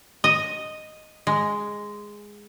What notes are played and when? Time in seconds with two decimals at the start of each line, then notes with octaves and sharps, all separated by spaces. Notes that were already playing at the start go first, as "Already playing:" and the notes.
0.24 D#5
1.27 G#3